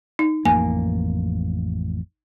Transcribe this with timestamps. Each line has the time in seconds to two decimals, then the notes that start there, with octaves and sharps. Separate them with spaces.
0.19 D#4
0.45 A1 F2 A#3 G#5